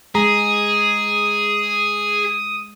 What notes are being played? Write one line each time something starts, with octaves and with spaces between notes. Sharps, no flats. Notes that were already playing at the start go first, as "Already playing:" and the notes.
G#3 G#4 A#5 D#6